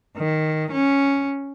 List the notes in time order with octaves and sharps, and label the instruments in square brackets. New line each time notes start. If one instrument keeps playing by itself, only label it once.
[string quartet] D#3
C#4